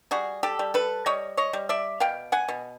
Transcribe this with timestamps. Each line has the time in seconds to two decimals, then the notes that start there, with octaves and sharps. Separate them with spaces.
0.11 G3 F#4 G#4
0.43 G4 A4
0.59 G3
0.74 A4 B4
1.06 G3 C#5 D#5
1.37 C#5 D#5
1.53 G3
1.69 D5 E5
2.00 B2 F5 G5
2.32 F#5 G#5
2.48 B2